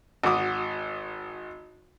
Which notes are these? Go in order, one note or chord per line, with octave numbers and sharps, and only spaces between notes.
G#1 F#4 D6 D#6